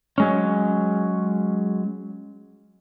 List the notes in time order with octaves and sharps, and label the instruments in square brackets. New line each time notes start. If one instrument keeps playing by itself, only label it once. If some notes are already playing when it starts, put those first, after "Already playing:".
[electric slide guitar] F#3 G#3 C#4